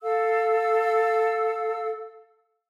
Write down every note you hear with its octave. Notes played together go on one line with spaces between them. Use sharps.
A4 F5 E6